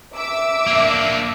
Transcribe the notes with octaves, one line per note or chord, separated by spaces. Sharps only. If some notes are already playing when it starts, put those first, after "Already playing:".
E5 D6 E6
A#3 D4